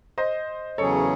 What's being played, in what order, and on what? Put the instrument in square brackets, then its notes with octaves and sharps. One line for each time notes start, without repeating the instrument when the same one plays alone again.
[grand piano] C5 D#5
[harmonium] E2 C#3 F#3 C#4 G#4 [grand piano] A4 C#5